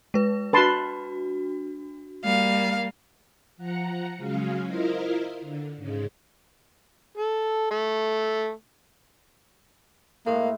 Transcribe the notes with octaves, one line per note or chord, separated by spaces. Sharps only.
G#3 B4
D4 F#4 B4 A5 C6
G3 A#3 F5
F3 F#5 A#5 C#7
C#3 F#3 G#3 C#4 F5
E4 F4 A#4 C5 D#5 F5
D3
G#2 C#3 G#3
A4
A3
A2 G#3 A#3